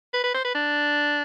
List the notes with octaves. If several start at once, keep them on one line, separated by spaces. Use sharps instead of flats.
B4
B4
C5
B4
D4